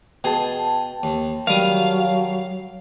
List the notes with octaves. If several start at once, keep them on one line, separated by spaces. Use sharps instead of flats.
B2 G#4 G5 A5
D#2
D#3 F#3 G3 F5 D#6